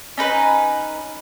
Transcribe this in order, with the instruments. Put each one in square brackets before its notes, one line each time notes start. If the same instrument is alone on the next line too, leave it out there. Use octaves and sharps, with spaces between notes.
[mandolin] C#4 D#4 B4